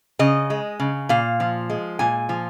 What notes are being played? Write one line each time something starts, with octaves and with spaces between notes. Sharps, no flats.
C#3 D#5
G#3
C#3
A#2 F5
F3
G#3
A#2 G#5
F3